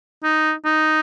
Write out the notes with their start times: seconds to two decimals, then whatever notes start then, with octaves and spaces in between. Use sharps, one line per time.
0.24 D#4
0.65 D#4